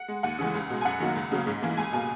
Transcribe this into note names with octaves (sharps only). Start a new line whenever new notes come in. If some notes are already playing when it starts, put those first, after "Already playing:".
Already playing: F#5
G#3
D#2 F#5
C#3 E3 G#3
C#2
B2 G#3
G#5
F#2 F#5
D#3 F#3 A#3
C#2
C#3 F#3 A#3
G#2
E3 A#3
C#2 G#5
B2 A#3 G#5